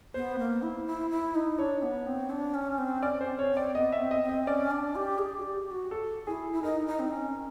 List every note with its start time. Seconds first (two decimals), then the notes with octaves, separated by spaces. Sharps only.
0.14 B3 C5
0.39 A#3
0.62 E4
0.86 E4
1.11 E4
1.35 D#4
1.59 D4 C#5
1.82 B3
2.07 C4
2.30 D4
2.54 C#4
2.78 C4
3.03 C#4 D5
3.21 C5
3.27 C4
3.39 C#5
3.51 C4
3.57 D5
3.74 B3 D#5
3.92 E5
3.99 C4
4.11 D#5
4.23 C4
4.29 D#5
4.47 C#4 D5
4.71 D4
4.95 G4
5.19 G#4
5.39 F#4
5.42 G4
5.67 G4
5.71 F#4
5.91 A4
6.27 E4 G#4
6.53 E4
6.63 D#4 A#4
6.87 D#4
7.00 C4
7.11 C#4